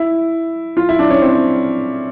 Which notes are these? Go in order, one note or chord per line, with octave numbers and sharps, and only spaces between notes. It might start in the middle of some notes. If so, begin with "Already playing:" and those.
Already playing: E4
F4
E4
D4
C#4
C4